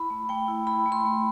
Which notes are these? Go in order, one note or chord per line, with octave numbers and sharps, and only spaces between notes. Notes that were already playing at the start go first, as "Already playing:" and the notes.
Already playing: E4 B5
A3
A3 G5
E4
E4 B5
A3
C6
A3